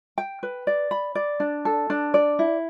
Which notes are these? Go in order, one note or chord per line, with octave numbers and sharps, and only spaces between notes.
G5
B4
D5
B5
D5
D4
A4
D4
D5
E4